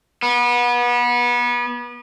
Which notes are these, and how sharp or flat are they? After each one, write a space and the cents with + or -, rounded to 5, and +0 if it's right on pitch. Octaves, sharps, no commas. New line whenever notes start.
B3 -30